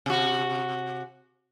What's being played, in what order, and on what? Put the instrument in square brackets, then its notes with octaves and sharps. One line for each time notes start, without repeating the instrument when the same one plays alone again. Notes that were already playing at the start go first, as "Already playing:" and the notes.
[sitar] C3 F#4